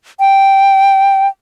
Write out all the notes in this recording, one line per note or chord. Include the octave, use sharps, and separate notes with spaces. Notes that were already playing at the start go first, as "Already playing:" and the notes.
G5